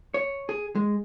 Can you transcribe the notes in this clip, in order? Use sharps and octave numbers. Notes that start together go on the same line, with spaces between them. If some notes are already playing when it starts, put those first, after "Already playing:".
C#5
G#4
G#3